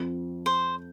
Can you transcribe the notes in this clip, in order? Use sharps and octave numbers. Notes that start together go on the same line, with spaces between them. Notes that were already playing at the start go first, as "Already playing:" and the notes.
Already playing: F2 F3 C4
C5